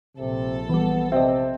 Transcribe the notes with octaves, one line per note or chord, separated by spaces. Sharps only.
A#1 C3 A4
E3 G3 B3
C3 C4 D#5 E5